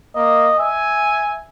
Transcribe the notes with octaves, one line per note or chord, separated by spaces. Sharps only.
A#3 D#5
E5 G#5